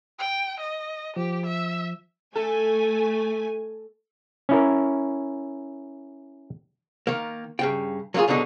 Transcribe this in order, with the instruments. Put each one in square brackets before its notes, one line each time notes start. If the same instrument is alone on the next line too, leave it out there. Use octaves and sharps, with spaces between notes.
[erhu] G5
D#5
[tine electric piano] F3 [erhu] G4
[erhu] E5
[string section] A3 G#5 [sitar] A4
[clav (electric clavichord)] C#4 E4 A#4
[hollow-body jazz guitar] D#3 A#3
G2 C#3 G5
F#3 A#3 D#4 F4 G#4
E2 B2 D3 F#3 D#4